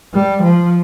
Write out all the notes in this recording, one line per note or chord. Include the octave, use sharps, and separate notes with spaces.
G3
F3